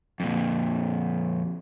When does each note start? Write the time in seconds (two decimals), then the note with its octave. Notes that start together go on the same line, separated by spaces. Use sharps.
0.20 F2 A#2